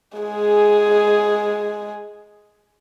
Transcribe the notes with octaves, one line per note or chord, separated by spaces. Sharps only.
G#3 G#4